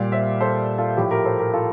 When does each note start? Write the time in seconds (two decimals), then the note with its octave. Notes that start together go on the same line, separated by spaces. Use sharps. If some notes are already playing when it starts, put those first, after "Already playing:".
Already playing: A#2 G3 D5 F5
0.12 C5 E5
0.41 A4 C5
0.78 F4 A4
0.97 A2 F3 G4
1.11 G4 A#4
1.25 A4 C5
1.39 G4 A#4
1.53 F4 A4